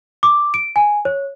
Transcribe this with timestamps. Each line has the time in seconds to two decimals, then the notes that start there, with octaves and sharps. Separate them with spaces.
0.23 D6
0.54 D7
0.76 G#5
1.05 C#5